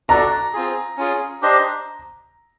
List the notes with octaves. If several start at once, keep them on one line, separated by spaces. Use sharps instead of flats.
D4 F#4 A4 D5 A#5
C4 F4 G#4
C#4 F4 G#4
D4 G4 C5 D#5